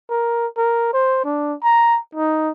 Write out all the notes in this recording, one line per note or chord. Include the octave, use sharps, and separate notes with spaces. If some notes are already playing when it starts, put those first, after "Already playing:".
A#4
A#4
C5
D4
A#5
D#4